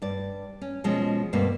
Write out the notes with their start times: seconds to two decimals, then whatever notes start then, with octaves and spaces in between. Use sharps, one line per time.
0.02 G2 D5
0.61 C#4
0.84 B2 F3 G#3 C#4
1.33 D2 G2 B2 A#3 C4 B4